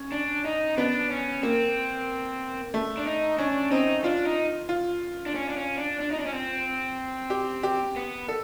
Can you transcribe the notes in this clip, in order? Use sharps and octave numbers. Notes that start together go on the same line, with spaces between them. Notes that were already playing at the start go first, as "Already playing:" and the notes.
Already playing: C#4
D4
D#4
B3 D4
C#4
A#3 C4
A3
D4
D#4
C#4 D4
C4 D#4
D4 F4
D#4
F4
D4
C#4
D4
C#4
D4
D4
D#4
D4
C#4
C4
G4
G4
B3
A4